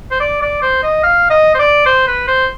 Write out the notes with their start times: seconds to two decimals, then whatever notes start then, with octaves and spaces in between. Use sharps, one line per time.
0.11 C5
0.20 D5
0.42 D5
0.62 C5
0.83 D#5
1.03 F5
1.30 D#5
1.55 C5
1.59 D5
1.86 C5
2.07 B4
2.27 C5